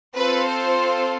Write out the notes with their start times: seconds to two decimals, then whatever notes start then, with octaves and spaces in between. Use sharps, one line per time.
0.17 C4 F4 A4 B4
0.47 C5